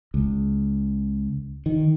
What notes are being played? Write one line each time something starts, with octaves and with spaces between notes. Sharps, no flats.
C#2
D#3